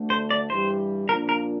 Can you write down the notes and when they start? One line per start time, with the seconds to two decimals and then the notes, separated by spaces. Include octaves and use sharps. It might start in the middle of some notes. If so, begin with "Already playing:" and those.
Already playing: D2 D3 A3
0.10 C5
0.31 D5
0.50 G2 E3 G3 C5
1.09 A#2 F3 A#3 D4 F4 A#4
1.29 A#4